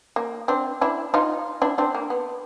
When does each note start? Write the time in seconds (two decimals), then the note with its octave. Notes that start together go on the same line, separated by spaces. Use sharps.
0.16 A#3
0.48 C4 D4
0.81 D4 E4
1.14 D#4 F4
1.62 D4 E4
1.78 C4 D4
1.95 A#3
2.10 B3